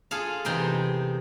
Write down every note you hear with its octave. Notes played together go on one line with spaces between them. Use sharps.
F4 G#4 A4 F5
E2 C3 D#4 G5 C6